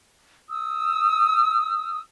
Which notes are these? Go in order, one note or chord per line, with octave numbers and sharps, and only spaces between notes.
D#6 E6